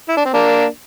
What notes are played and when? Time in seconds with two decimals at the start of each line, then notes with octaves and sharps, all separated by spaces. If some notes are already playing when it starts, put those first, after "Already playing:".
0.09 E4
0.17 D4
0.25 C4
0.34 A#3 D4